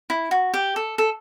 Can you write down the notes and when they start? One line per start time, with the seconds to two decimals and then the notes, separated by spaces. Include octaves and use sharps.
0.10 E4
0.31 F#4
0.54 G4
0.76 A4
0.98 A4